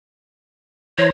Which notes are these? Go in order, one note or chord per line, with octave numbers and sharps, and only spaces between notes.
E3 C5 C#5 A#5